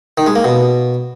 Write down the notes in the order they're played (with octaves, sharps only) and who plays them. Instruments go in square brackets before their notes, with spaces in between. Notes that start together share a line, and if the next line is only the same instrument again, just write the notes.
[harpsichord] D#3
G#3
A#3
B2